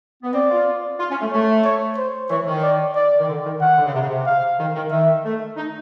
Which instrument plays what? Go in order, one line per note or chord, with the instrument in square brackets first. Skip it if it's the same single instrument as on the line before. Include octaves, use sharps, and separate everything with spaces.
[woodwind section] B3
[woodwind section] C4 [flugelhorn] D5
[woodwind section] F4
F4
C#4
A3
[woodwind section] A3 [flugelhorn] C#5
[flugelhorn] C#5
C5
[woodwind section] E3 [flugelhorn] C#5
[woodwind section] D#3
[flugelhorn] D5
D5
[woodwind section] D#3
D3
D#3
[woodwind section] D#3 [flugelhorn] F#5
[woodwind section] D3
C#3
C3
C#3
C3
[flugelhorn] F5
[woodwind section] D#3
D#3
[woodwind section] D#3 [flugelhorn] E5
[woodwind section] A3
D#4